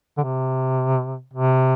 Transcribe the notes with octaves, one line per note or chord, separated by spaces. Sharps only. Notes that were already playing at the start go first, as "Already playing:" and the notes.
D3
C3
C3